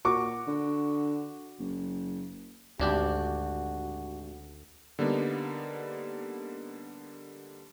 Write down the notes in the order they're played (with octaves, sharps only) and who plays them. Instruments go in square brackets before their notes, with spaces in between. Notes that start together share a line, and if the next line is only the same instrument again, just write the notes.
[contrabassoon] A#2 [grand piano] F#4 C#6 D6
[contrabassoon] D3
F#1
[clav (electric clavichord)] G#1 D4 G4 [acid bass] D2 [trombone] F#4
[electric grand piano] D3 G3 A#3 B3 D#4